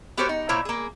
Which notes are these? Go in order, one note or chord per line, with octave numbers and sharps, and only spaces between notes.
B3 F#4 G4 A#4 C5 C#5
D#4
A#2 A#3 E4 C5 C#5
A#3 G#4